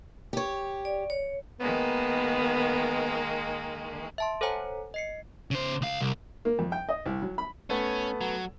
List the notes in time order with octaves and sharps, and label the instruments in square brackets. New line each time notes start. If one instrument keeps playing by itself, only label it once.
[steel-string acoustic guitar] G4 C#5
[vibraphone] D5
C#5
[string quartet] D#3 G#3 A#3 [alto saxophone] B3
[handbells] E5 A5 C6
A4 C5 C#5 F#5 G#5 A#5
D#5 C7 C#7
[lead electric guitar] C#3 C5
C#2 F5
C2
[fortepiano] A#3
F2
G5
D#5
C2
F#3
B5
[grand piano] A3 B3 [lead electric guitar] C#4
[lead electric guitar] F#3